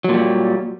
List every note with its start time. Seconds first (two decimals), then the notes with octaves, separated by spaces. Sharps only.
0.04 F#3
0.09 A#2
0.14 G3